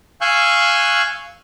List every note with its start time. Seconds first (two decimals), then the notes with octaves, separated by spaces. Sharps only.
0.21 F5 G#5 C#6 E6 F#6 G6